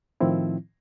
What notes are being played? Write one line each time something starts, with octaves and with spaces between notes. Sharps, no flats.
A2 D#3 F3 C4 E4